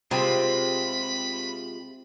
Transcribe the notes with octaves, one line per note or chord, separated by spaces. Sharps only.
C3 G#3 C4 F4 B5